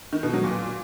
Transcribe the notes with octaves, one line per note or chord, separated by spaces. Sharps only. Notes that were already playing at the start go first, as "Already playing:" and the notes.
D#3
B2
F#3
A#2